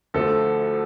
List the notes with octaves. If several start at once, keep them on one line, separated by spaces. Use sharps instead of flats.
D2 D3 F3 A3 A4